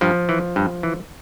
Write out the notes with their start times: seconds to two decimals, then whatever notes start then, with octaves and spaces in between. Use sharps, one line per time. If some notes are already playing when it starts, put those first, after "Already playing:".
0.01 G2 F3
0.29 E3
0.56 G2
0.83 E3